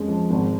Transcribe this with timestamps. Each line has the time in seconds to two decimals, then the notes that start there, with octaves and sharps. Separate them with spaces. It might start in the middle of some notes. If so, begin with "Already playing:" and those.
Already playing: F2 G#3 C#4
0.08 F3
0.30 G#1